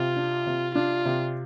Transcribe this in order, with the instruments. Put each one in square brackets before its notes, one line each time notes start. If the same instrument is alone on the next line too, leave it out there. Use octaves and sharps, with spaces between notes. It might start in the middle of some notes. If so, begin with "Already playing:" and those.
Already playing: [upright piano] C3 [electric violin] F4
[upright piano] D4
C3
[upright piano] D4 [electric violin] F4
[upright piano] C3